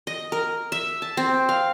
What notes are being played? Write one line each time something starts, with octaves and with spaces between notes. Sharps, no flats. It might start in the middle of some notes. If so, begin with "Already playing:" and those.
D#5
A#4
E5
A5
C4
F5